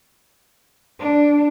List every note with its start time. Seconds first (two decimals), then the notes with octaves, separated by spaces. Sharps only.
0.99 D4